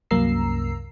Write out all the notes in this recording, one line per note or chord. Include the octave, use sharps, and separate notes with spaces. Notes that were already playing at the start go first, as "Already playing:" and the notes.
C2 F#2 A#3 A#5 E6 C7